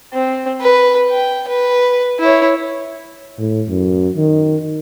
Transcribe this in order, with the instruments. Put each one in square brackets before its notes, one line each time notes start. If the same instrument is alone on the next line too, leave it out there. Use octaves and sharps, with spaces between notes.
[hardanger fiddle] C4
B4
G5
B4
E4 C#5
[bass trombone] A2
F#2
D#3